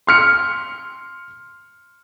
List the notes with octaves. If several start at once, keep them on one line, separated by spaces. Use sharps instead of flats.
C6 F6 C#7